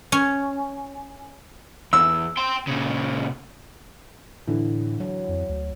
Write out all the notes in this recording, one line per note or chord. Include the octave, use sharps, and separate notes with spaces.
C#4
E2 E6
G5 C6
A#2 C#3
A2 D3 E3
F#3
F2
D2